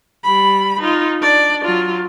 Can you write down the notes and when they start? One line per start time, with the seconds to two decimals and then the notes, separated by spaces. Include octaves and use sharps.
0.24 G3 B5
0.80 D#4 F4
1.20 D4 D5
1.65 F#3 F4